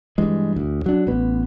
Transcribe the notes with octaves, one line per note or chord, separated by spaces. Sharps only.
G2 E3 G#3
D2
F#3 D4
A1 B3